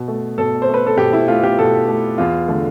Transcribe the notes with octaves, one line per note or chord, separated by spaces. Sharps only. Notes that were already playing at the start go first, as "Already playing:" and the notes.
Already playing: B2
A3
B2 A4
C5
A3
B4
A4
B2 G4
E4
A3 F4
G4
B2 A4
A3
E2 F4
D3 A3